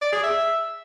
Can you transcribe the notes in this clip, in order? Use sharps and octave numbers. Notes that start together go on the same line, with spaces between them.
D5
G#4
E5